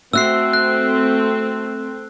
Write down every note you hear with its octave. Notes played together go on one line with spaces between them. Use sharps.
A3 C4 F#4 E5 E6 F#6 C7
F#6